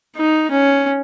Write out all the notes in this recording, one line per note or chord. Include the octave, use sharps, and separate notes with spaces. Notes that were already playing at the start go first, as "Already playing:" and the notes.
D#4
C#4